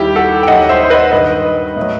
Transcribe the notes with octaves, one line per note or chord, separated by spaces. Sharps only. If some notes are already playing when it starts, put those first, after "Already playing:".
Already playing: D#2 D#3 G3 E4 G4
F#4 A4
G5
D#2 D#3 F#3 D#5 F#5
C5 E5
C5
B4 D#5
G2 D#3 G3 B4 D#5
A2 F#3